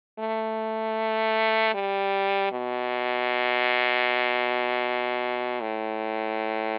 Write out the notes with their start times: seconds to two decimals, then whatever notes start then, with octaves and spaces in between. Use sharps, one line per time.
0.19 A3
1.74 G3
2.52 B2
5.61 A2